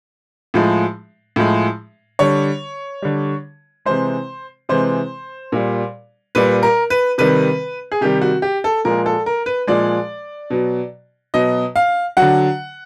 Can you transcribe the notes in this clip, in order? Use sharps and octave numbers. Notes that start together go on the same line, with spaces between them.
A2 F3 G#3
A2 F3 G#3
D3 G3 C#5
D3 G3
C3 E3 G#3 C5
C3 E3 G#3 C5
A#2 G3
A#2 G3 B4
A#4
B4
C3 D#3 G3 B4
G#4
C3 D#3 G3 G4
F#4
G4
A4
A#2 F3 G#3 A#4
A4
A#4
B4
A#2 F3 G#3 D5
B2 F#3
B2 F#3 D#5
F5
D3 F#3 F#5